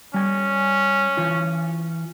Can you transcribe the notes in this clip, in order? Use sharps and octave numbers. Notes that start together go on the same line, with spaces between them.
G3 C#4 G#5
E3 F4